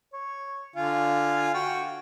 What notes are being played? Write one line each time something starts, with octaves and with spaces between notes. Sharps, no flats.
C#5
D3 F4 G#5
F#4 G5